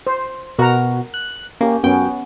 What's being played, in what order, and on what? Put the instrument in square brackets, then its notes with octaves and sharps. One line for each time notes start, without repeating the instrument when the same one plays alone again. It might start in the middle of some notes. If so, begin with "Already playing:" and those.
[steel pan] C5
[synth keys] B2 F#4 [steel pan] A#4 F#5 A#5
[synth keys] F#6
[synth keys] A#3 [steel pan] C#4 G4
[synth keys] F#2 G5 [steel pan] B3 C#4